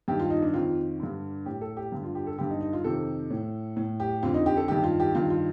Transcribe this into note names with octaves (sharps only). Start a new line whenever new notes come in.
G2 D#3 G4
F4
D#4
D4
F2 D#3 F4
G2 D3
A2 G4
A4
G4
G2 D3
F4
G4
A4
G2 D3 G4
D#4
D#4
F4
F2 C3 D#3 A4
A2
A2
G4
F2 D3 F4
D#4
G4
A4
G2 D#3 G4
F4
G4
G2 D#3 F4
F4